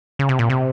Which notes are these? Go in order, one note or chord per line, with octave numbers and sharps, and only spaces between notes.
C#3
C3
A#2
C3